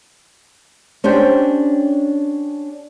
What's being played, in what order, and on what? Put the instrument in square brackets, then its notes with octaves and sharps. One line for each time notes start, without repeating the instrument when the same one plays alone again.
[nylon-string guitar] C#4 D4 G4 C5 G5